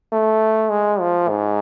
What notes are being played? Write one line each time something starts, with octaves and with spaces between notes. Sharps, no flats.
A3
G#3
F3
G#2